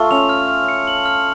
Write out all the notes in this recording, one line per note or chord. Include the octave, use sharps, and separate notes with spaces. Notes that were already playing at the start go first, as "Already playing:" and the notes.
Already playing: A3 F4 C#6
C#4 F7
F6
F6
C#7
F#7
F6